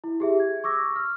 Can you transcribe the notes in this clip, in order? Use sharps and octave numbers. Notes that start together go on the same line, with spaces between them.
E4
G4 G#4 E5
G#6
C#6 D6 E6 A#6
F6